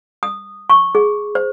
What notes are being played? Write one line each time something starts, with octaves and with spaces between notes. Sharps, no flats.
D#6
C#6
G#4
C5